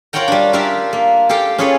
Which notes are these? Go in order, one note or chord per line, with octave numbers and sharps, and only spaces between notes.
F4 A#4 C#5 F#5 G5 A#5
G3 D4
D4 F4 G4 A#4 E5
A#3
G4 A4 F5 G5
C#4 F4 G#4 A4 B4 C#5